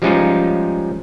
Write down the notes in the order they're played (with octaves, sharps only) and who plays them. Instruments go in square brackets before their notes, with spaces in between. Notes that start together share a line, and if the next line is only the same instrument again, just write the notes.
[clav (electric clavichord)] F3 G3 G#3 C#4 D#4 F4